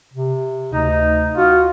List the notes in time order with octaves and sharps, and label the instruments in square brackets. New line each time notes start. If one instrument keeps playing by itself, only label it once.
[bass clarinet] C3
[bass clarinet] D2 [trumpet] D#4
[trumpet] F4 [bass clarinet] F#4